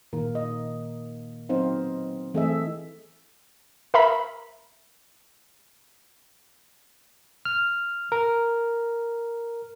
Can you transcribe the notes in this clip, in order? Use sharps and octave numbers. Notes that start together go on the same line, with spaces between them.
A#2 D#3 A#3 A#4
D#5
F#3 B3 C4 D#4 C5 F5
E3 A3 C4 G#4 D#5 E5
A#4 E5 A#5 B5
F6
A#4